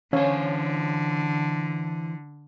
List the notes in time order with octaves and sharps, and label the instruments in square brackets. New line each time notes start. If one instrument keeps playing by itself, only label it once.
[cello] D3 [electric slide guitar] E3 C5 [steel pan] C#4 C#5 F5